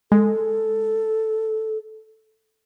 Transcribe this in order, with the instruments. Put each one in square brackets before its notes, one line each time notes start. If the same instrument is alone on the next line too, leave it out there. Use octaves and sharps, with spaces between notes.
[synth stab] G#3 [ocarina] A4